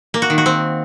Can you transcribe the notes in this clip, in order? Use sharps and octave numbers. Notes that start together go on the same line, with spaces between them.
A#3
F#4
D#3
F#4
C4